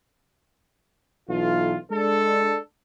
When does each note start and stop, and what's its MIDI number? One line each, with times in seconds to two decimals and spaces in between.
1.29 1.75 35
1.29 1.75 52
1.29 1.75 57
1.29 1.75 65
1.90 2.57 56
1.90 2.57 62
1.90 2.57 69